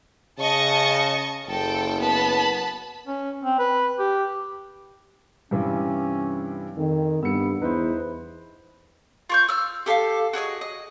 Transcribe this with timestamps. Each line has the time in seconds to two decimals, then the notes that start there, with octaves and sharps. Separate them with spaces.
0.39 C#3 D#5 A5 C#6
1.48 F#1 A4 G5
2.00 B3 A5 B5
3.07 C#4
3.44 C4
3.59 B4
3.99 G4
5.51 G2 C3 E3 C#4
6.77 F2 D#3
7.23 G2 B3 E6 C#7
7.62 E2 D#4 E4 B4 C5
9.30 F4 C#6 G6
9.48 E6 F6
9.86 G4 A4 D#5 F5
10.33 F#4 G#4 D5 D#5
10.61 D#5